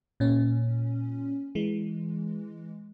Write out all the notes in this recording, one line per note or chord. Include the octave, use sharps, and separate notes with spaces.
A#2 C#4
E3 G#3